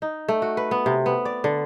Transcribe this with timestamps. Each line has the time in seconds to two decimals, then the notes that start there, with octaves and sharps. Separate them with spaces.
0.02 D#4
0.28 A3
0.42 F#4
0.57 B4
0.71 B3
0.86 C3
1.06 B3
1.25 D5
1.44 D3